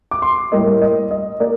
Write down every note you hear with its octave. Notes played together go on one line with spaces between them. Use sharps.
D6
C6
A2 G3 A#3 D#5
D#5
D#5
A#3 D5